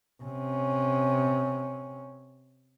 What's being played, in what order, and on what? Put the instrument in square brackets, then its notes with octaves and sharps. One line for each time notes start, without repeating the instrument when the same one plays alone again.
[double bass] C3 C#4